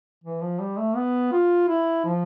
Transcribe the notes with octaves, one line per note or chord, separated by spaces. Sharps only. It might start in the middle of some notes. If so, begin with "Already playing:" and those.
E3
F3
G3
A3
B3
F4
E4
F3